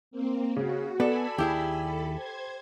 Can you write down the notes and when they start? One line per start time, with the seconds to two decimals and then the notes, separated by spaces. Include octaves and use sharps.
0.11 A#3 C4
0.56 C#3 F#4
1.00 B3 A4 D5 G#5 B5 E6
1.38 D#2 E4 G4 G#4
1.78 A4 B5
2.11 C5 G#6